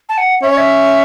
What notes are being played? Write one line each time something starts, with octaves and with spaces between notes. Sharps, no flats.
A5
F#5
C#4 E5
C#5
E5